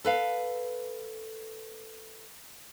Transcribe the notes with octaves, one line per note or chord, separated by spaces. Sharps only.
A4 B4 F5